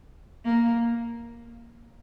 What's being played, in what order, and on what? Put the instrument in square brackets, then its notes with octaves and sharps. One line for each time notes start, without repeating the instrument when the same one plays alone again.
[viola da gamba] A#3